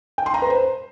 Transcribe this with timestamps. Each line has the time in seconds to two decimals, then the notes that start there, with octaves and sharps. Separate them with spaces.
0.18 G5
0.26 C6
0.34 A#5
0.42 B4
0.50 C5